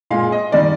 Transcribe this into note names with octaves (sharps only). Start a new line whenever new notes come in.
A#2 G#3 F5
D#5
D#3 G3 D5